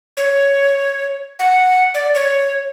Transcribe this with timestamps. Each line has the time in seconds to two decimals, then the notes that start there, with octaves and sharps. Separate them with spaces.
0.17 C#5
1.39 F#5
1.94 D5
2.15 C#5